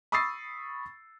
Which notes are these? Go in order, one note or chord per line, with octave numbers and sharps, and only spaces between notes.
B5 C#6 D#6 E6 A6 C7